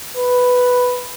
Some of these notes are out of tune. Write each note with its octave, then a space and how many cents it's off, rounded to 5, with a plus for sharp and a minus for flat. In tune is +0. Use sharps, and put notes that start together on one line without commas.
B4 +5